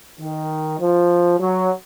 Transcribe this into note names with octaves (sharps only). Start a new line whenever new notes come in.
D#3
F3
F#3